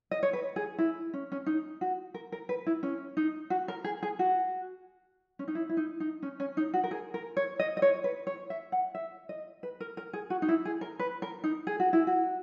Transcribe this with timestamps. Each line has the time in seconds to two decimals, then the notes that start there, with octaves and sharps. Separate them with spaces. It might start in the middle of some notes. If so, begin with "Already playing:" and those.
0.11 D#5
0.23 C#5
0.33 B4
0.56 G#4
0.78 E4
1.14 C#4
1.32 C#4
1.46 D#4
1.81 F#4
2.14 A#4
2.32 A#4
2.49 B4
2.67 E4
2.83 C#4
3.17 D#4
3.50 F#4
3.68 A#4
3.84 G#4
4.03 G#4
4.19 F#4
5.39 C#4
5.48 D#4
5.55 E4
5.69 E4
5.77 D#4
6.00 D#4
6.23 C#4
6.40 C#4
6.57 D#4
6.74 F#4
6.84 A#4
6.91 G#4
7.14 A#4
7.37 C#5
7.60 D#5
7.77 D#5
7.82 C#5
8.04 B4
8.27 C#5
8.50 E5
8.72 F#5
8.95 E5
9.29 D#5
9.63 B4
9.80 A#4
9.97 A#4
10.13 G#4
10.30 F#4
10.42 D#4
10.48 E4
10.65 G#4
10.81 A#4
10.99 B4
11.22 A#4
11.44 D#4
11.67 G#4
11.80 F#4
11.93 E4
12.07 F#4